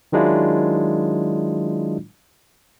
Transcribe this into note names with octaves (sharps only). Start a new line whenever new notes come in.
D#3 F#3 G#3 D4 E4 F4